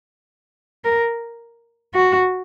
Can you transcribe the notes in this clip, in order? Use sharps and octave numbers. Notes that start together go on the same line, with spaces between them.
A#4
F#4